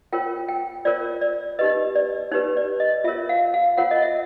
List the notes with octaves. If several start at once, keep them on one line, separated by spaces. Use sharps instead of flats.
F4 A#4 C#5 G5
G5
F4 A#4 C#5 D5
D5
D#4 G4 B4 D#5
D5
D#4 G4 B4 C#5
D5
D#5
F4 A#4 C#5 E5
F5
F5
F4 A#4 C#5 F#5
D#5
E5